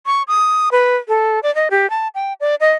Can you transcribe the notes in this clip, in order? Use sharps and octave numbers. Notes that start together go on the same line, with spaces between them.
C#6
D#6
B4
A4
D5
D#5
G4
A5
G5
D5
D#5